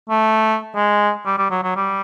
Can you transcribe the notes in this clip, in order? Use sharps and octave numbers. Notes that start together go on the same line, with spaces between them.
A3
G#3
G3
G3
F#3
F#3
G3